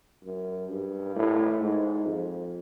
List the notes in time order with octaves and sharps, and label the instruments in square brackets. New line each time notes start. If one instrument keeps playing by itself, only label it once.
[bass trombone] F#2
G2
A2
G#2
F2